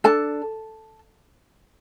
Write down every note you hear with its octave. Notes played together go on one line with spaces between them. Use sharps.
D4 A4 A5